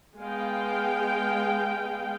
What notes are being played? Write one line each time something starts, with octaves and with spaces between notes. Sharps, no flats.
G#3 B3 F5 G5